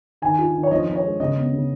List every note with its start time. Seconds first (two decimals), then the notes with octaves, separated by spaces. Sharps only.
0.22 D#3 G#5
0.39 F4
0.54 D#3
0.63 C#5
0.71 F3 D#5
0.87 F3
0.95 C#5
1.03 G#3
1.20 C#3 D#5
1.36 B3
1.53 C#3